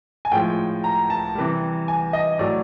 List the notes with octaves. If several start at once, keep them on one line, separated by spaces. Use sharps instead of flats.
G#5
A2 F3 G#3 G5
A#5
A5
C3 E3 G3
G#5
D#5
A2 F#3 D5